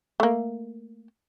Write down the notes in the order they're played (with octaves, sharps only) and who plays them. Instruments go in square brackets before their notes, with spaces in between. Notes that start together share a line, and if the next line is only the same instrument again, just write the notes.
[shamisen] A3 A#3